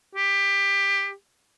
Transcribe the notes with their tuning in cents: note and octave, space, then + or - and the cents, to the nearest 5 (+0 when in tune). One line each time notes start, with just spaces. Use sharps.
G4 +20